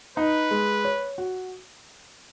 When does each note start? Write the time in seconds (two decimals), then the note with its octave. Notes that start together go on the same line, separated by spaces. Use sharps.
0.17 D#4 B4
0.51 G#3
0.85 C#5
1.18 F#4